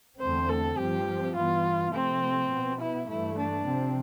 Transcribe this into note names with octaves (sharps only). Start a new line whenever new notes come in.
E2 D3 A3 C4 C5
A4
G2 F3 C4 G4
G2 E3 B3 F4
C3 F3 A3 C4
B2 B3
E4
G2 E3 A3 E4
D4
C3 F3 C4